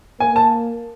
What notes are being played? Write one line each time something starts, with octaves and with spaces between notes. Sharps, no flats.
A#3 G#5
A5